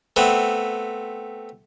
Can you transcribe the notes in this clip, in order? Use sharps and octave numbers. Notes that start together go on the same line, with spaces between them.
A3 B3 C4